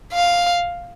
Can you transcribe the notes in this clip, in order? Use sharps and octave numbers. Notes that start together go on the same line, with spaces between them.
F5